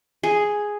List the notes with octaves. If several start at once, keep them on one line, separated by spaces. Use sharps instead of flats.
G#4